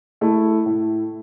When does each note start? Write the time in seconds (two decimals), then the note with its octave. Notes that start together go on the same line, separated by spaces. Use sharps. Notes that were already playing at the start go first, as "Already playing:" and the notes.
0.21 A3 E4
0.66 A2